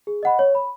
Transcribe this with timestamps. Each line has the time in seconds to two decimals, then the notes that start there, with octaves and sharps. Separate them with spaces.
0.07 G#4
0.23 D#5 F#5 B5
0.39 C#5
0.55 B5